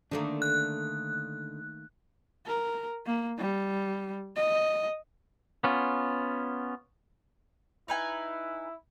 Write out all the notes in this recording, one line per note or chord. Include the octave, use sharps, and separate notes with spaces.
D3 D#3 A3 A#3 D4
F#6
A#4
A#3
G3
D#5
B3 C#4 F4
D#4 E4 B4 G#5